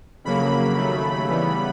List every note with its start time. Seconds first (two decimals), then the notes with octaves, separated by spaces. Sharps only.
0.24 F2 C#3 F#3 A#3 B5
0.77 D#2 C#3 F#3 A3
1.28 C#3 E3 G3 B3